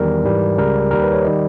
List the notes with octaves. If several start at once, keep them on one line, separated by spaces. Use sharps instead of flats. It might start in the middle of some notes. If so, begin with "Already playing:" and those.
Already playing: E2 D#3 G3 A#4
G#2 E3 G3
C#2 C#3 G3 A#4
D#2 D#3 G3 A#4
B4
C#5
D#3 G3 D#5